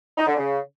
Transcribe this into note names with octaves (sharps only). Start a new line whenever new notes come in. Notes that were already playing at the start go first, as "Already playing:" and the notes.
D#4
D3
C#3